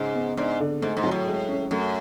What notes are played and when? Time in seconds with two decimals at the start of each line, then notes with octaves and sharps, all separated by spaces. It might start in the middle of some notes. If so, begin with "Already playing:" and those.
Already playing: G#2 C#3
0.15 B3
0.37 G#2 D4
0.60 D3
0.82 G#2 A3
0.97 G#2
1.04 F#3
1.11 A2
1.27 G#3
1.48 C#4
1.71 F#2 A3